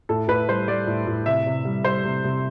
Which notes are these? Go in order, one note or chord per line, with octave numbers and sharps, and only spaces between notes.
A2 A4
A2 B4
G3 C5
G3 D5
A2
A2
C3 E5
C3
G3
G3 C5
C3
C3